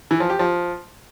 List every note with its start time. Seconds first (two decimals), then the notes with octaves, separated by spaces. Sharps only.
0.11 E3
0.20 F3
0.30 G4
0.39 F3